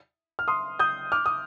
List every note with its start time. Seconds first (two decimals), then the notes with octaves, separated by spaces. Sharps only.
0.39 F6
0.48 C6 D#6
0.79 D#6 G6
1.12 D6 F6
1.26 D#6